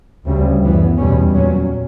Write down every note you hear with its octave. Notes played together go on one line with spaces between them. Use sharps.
D2 C#3 G3
F#2 E3 B3
E2 B2 G3 C#4
A#2 F#3 C#4